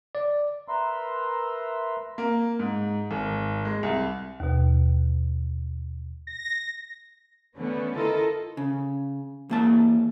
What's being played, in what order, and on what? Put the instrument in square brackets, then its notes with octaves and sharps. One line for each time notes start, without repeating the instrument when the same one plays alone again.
[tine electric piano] D5
[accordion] A#4 B4 E5 A#5 C6 E6
[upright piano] A#3
G#2
G#1
G#3
C2
[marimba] D#2 B2
[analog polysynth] A#6
[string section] D3 A3 B3 C#4
E4 F4 A4 A#4 D#5
[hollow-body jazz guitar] C#3
E2 A#3 A5